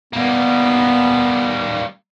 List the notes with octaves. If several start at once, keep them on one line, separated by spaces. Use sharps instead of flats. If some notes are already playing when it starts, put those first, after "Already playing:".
G3 A#3 B3